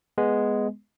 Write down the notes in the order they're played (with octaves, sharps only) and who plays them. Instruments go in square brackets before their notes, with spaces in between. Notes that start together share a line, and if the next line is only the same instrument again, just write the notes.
[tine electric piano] G#3 B3